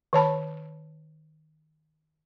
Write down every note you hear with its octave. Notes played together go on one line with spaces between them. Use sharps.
D#3 C#5 A5 B5